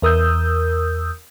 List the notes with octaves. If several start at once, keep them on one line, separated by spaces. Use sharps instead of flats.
E2 A#4 D#6 E6 G6